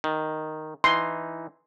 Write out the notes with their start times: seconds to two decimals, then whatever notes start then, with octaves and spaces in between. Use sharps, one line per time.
0.04 D#3
0.84 E3 D#4 C6